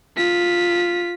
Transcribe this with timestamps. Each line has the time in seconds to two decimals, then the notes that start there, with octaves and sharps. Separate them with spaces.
0.17 F4 B6